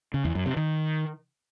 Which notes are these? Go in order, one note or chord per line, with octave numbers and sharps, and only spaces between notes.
C#3
E2
F#2
C3
D#3